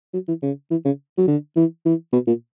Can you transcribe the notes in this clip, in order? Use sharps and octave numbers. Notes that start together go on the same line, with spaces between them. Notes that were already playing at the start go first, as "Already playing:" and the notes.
F#3
E3
C#3
E3
C#3
F#3
D3
E3
E3
B2
A#2